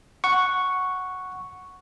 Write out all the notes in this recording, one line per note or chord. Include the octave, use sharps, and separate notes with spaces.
F#5 C#6